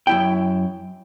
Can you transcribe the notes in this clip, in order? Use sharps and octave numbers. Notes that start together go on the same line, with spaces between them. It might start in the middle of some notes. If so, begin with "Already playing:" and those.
F#2 E4 G5